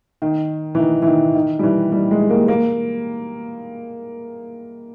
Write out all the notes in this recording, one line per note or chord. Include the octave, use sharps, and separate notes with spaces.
D#3
E3
D#3
E3
D#3
D#3
G3
E3
G3
G#3
A#3
A#3